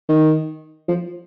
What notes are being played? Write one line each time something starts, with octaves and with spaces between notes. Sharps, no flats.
D#3
F3